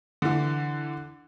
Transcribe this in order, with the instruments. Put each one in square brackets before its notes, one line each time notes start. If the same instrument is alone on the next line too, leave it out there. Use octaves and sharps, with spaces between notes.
[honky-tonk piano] D3 E3